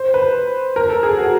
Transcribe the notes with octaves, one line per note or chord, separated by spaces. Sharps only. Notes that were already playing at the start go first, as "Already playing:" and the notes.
Already playing: C5
B4
A#4
A4
G#4
F#4